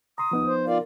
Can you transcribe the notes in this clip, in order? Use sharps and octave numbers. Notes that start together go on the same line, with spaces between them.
A#5 C6 D#6
D#2 F3 B3 D#4
C5
F4 A#4 D5 F5